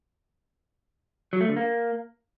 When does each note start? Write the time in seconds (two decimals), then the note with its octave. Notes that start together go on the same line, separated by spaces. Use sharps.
1.33 F#3
1.41 A3
1.49 D3
1.56 A#3